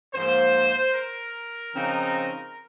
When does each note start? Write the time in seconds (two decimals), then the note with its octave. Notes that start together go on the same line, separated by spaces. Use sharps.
0.15 G#2 F3 A#3 C5
0.94 A#4
1.74 C#3 F3 C4 D#4